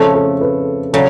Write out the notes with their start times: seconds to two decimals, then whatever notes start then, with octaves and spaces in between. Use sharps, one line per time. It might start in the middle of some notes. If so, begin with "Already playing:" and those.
Already playing: F2 C#3 F3 A3 A4
0.15 A4
0.41 B4
0.93 C#3 F#3 A4